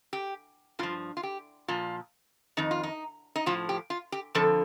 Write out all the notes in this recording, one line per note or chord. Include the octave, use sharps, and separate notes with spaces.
G4
G2 F3 F4
F4
G4
A#2 F3 F4
F2 D#3 D#4
F4
D#4
D#4
A2 F3 F4
G4
F4
G4
F2 D3 F3 A4